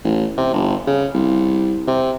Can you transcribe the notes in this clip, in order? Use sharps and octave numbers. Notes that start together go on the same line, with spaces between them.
A1
C3
G1
C#3
C2
C3